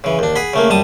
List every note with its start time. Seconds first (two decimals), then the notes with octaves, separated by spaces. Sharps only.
0.04 C#3 E3
0.19 D#2 D4
0.36 G#4 F#5 B5
0.53 C#3 A3 A#3
0.69 F#2 G3 A5 D#6